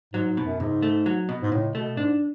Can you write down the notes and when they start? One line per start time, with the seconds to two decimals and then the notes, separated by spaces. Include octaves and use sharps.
0.14 G#2 F#3
0.30 G#2
0.37 B2
0.45 F#2
0.60 C#2 G#2
0.83 A3
1.06 F#3
1.29 B2
1.42 G#2
1.52 C#2 A2
1.75 B2 A3
1.97 G#2 D4